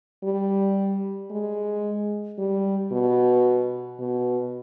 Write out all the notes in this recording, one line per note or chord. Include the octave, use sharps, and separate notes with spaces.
G3
G#3
G3
B2
B2